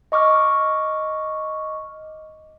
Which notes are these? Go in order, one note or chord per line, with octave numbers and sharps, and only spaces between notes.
D#5 C#6 D6 F6